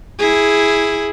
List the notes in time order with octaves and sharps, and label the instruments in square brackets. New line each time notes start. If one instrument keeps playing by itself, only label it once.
[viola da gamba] E4 G#4